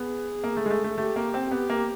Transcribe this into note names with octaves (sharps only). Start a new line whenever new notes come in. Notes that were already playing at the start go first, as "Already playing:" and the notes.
Already playing: B3 G#4
A#3
A3
G#3
A3
A3
A3 G4
A#3
C4
B3 G4
A#3